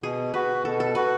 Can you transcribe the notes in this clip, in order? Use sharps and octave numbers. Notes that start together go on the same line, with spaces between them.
B2 G#4
F#4 B4
B2 A4
A4
F#4 B4